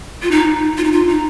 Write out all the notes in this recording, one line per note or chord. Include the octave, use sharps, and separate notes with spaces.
F4
D#4
F4
D#4
F4
D#4